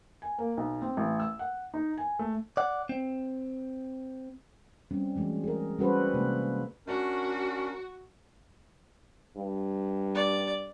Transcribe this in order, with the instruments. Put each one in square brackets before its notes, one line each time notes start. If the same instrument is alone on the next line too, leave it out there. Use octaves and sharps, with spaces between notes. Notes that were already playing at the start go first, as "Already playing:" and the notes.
[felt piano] G#5
A#3
B1
C4
A1
E6
F#5
D#4
G#5
A3
[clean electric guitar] D5 F#5
C4
[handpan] G3 C4 C#4
E3 F#3 G#3 A3
G#4 A#4
G3 C#4 F#4 A4 B4 C5
C3 G#3 A#3
[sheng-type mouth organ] C#4 D4 A#4 [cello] F#4
[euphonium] G2
[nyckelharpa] D5